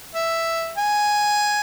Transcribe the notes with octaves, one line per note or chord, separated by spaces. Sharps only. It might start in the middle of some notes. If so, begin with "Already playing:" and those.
E5
G#5